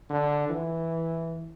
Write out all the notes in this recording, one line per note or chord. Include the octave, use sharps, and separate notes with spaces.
D3
E3